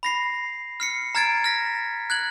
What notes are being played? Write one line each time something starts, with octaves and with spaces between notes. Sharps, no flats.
B5 A#6 C7
F6 C7 C#7
A#5 F6 G#6 A6 D7
F6 A#6 B6
F#6 G#6 F#7